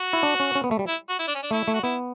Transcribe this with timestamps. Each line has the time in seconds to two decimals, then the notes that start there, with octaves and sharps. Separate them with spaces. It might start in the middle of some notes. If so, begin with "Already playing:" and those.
Already playing: F#4
0.13 E4
0.23 D4
0.40 C#4
0.55 C#4
0.64 B3
0.71 A3
0.79 G3
0.87 E4
1.09 F#4
1.19 E4
1.27 D4
1.35 C#4
1.43 D4
1.51 A3 E4
1.68 A3
1.74 F#4
1.83 B3 E4